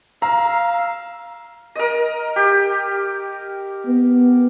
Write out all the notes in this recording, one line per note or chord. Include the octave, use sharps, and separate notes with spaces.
F5 A#5 E6
A#4 D#5
G4
B3